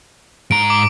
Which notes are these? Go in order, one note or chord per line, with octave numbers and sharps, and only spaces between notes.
G#2 A#5 D7
D6